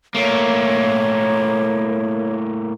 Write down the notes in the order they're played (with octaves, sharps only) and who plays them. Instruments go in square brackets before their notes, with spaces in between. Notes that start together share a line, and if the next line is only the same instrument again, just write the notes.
[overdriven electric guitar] A2 A#3 [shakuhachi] C#5